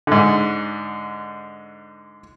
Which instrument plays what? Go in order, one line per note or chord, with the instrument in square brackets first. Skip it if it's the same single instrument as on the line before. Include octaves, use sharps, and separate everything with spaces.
[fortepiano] G#2 D3